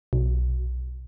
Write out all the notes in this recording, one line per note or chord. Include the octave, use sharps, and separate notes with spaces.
B1